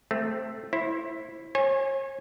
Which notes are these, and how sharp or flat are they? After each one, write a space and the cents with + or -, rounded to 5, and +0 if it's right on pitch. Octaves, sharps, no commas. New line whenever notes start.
A3 +0 C4 +0
E4 +0 C5 +30
C#5 -40 G#5 -10